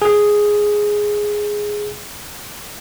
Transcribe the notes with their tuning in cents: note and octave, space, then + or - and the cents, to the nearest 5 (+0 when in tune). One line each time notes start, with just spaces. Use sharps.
G#4 +0